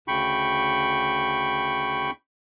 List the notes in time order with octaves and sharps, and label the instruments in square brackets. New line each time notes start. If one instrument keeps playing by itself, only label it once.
[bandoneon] D2 C#3 G5 B5 C#6